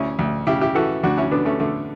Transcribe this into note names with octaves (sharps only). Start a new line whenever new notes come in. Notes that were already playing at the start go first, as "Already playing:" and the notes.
Already playing: D2 C#4 E4
D2
C#3 E4 G4
E4 G4
E3 F#4 A4
D2 D4 F#4
C#4 E4
D3 B3 D4
A3 C#4
D3 A3